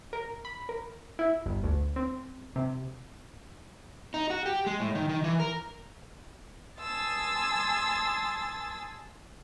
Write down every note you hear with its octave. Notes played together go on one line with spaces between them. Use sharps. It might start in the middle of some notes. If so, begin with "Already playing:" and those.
A#4
B5
A#4
E4
G1
D2
C4
C3
D#4
F#4
G4
G#3
A2
D#3
D#3
E3
A#4
G#5 A5 C6 D#6 E6 A6